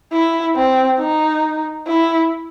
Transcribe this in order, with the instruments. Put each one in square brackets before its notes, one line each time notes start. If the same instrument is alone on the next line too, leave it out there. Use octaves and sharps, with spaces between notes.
[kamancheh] E4
C4
D#4
E4